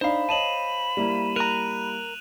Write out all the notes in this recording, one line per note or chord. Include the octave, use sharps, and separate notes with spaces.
D4 D#4 C5 F5 B5
C#5 D#5 A5 D#7 E7 F#7
G3 A#3 E4
A#4 A#5 F#6 D#7 F7